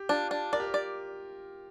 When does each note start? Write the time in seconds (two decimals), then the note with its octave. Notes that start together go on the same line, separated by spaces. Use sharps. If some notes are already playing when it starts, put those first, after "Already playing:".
Already playing: G4
0.09 D4 F4
0.31 D4
0.53 A#4 D5
0.60 G4
0.68 A#4
0.74 D5